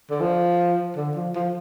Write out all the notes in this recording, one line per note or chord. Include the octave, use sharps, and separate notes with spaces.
D3
F3
D3
F3
F3